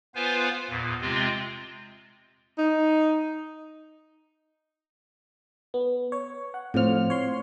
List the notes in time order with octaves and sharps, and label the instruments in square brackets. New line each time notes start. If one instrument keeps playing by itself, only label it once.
[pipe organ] B3 F4 B4 C5 F5 G#5
E2 A#2
C3 G#3 C4 F4
[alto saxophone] D#4
[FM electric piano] B3
C#5
F#5
[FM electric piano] A2 F3 F6 [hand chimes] C4 C5
[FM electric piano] C#5 C6